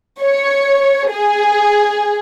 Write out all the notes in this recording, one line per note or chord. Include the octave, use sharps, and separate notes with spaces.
C#5
G#4